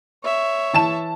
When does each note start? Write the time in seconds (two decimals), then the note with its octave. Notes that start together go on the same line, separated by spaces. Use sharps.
0.24 C#5 E5
0.73 E3 A5 E7